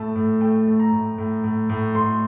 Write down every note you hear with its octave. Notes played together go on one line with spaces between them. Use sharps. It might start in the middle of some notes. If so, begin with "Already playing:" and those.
Already playing: A2 A3 A5
A2
A3 G5
A3
A#5
A2
A2
A2
A2
A2 C6